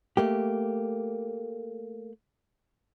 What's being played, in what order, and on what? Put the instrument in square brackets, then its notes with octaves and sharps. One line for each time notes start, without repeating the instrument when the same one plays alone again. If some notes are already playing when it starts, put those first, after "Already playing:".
[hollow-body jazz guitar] A3 A#3 G4